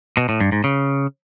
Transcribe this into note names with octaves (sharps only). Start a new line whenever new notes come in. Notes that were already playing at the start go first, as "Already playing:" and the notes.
B2
A2
G2
G#2
C#3